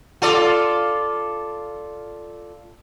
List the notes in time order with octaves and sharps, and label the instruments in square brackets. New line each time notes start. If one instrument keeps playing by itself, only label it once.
[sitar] F4 A4 D5